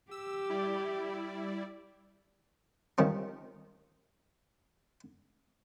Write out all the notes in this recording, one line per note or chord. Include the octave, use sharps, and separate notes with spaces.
G4 E6
G3 E4 D5
D#3 G3 C4 C#4 F4